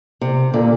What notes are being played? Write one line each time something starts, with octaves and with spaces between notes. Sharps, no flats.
C3
A#2 D3